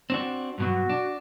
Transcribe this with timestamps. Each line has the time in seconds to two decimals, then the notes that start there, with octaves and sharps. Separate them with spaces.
0.10 C4 D4 F#4
0.58 G2 B2 F#3 F#4
0.89 D4